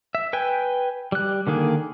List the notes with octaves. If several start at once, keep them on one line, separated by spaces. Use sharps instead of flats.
E5
B4 G5 G#5
G3 F#6
D3 D#3 A#3 G#4